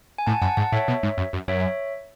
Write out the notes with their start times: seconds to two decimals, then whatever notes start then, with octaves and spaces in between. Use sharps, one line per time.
0.18 G#5
0.27 A2 F#5 A5
0.42 F#2 F#5 A5
0.57 G#2 F#5 A5
0.72 A2 C#5 E5
0.88 B2
1.03 G#2
1.18 F#2
1.33 F#2
1.48 F#2 C#5 E5